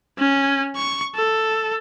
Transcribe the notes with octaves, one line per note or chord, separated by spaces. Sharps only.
C#4
C#6
A4